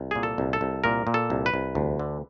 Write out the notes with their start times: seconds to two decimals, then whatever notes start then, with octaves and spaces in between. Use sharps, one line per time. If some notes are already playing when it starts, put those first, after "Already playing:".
Already playing: C2
0.11 A#2 G#4
0.23 A4
0.38 C2
0.53 A4
0.61 C2
0.84 A#2 A#4
1.07 A#2
1.14 A4
1.30 C2
1.46 B4
1.54 C2
1.75 D2
2.00 D3